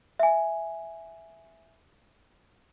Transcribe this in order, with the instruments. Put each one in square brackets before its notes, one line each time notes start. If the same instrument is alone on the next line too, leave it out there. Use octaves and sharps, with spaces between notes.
[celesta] E5 G#5